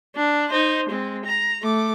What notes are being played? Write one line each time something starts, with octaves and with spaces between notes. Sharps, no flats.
D4
D#4 C5
G#3 C4
A#5
A3 D6